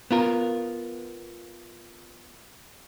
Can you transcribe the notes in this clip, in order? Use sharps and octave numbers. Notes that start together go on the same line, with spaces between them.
B3 F4 A#4